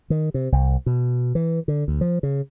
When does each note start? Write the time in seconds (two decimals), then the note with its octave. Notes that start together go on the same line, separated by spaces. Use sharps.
0.10 D#3
0.34 C3
0.52 C2
0.86 B2
1.35 E3
1.68 D3
1.88 D2
2.01 F3
2.23 C#3